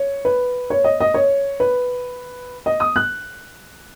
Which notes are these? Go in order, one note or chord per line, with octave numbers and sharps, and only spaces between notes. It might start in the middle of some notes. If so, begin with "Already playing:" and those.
Already playing: C#5
B4
C#5
D#5
D#5
C#5
B4
D#5
D#6
F#6